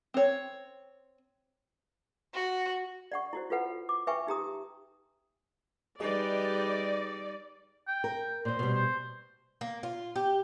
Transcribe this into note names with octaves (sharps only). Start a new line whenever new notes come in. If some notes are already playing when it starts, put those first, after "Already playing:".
C4 C#5
F#4
D5 F#5 C#6
E4 F#4 C5
F4 A4 B4 F#5
D6
B4 E5 G5 G#5 C#6
D#4 G4 A#5 D#6
G3 D#4 G4 G#4 B4 D5 D#5
G5
A#4
A#2 C5 D#5
B2 G3
C5
A#3
F4
G4